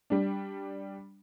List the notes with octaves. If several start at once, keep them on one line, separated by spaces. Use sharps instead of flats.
G3 D4